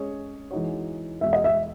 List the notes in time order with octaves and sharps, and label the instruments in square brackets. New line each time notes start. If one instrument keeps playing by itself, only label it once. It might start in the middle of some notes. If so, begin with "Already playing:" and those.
Already playing: [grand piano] G#3 C#4 G#4 C#5
E3 G#3 D#4 F#4 C#5
[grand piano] E2 B2 G#3 [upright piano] E5
[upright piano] D#5
E5